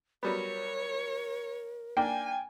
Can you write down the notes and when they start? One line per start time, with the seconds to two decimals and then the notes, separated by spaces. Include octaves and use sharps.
0.23 F#3 G3 B3 A#4 C#5
1.97 A#3 D4 G5 G#5